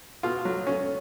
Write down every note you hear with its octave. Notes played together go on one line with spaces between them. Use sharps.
B2 F4
F#3
C#4